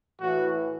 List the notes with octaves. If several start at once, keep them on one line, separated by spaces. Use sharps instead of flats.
A2 E3 F#4